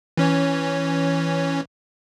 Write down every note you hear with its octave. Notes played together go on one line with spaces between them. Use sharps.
E3 C#4 C#5